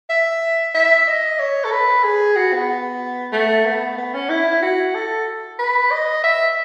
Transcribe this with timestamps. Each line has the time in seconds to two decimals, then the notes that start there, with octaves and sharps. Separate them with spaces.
0.10 E5
0.75 E5
1.08 D#5
1.40 C#5
1.65 A4
1.72 B4
2.04 G#4
2.36 F#4
2.53 B3
3.33 A3
3.65 B3
3.98 B3
4.14 C#4
4.30 E4
4.63 F#4
4.95 A4
5.59 B4
5.91 D#5
6.24 E5